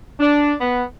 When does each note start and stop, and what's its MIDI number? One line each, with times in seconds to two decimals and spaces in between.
0.20 0.53 62
0.60 0.83 59